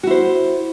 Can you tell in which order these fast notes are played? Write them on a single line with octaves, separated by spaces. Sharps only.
F#4 E4 C5